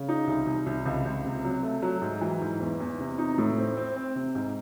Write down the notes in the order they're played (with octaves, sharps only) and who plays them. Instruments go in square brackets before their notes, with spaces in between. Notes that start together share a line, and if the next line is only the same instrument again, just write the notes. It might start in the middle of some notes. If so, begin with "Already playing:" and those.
Already playing: [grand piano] C#3
D#4
C2
C2
C2
C#2
C#2
C3
F#3
A3
F#3
G#2
E3
G#2
E2
E2
C3
D#4
A2
C4
C4
C4
C3
G#2